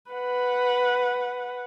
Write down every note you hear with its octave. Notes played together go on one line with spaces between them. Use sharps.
B4 F#5